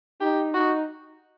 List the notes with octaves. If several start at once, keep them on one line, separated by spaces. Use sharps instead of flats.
D#4 G4
D#4 F#4